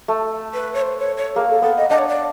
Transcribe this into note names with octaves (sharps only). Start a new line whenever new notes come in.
A3
B4
C#5
C5
C#5
C#5
A#3 G#4
A4
B3 A4
D#5
D4 D#5
C#5
D5